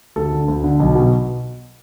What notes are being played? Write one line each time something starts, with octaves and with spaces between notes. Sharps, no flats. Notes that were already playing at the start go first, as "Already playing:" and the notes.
D2 A4
D3
D2
D3
B1
B2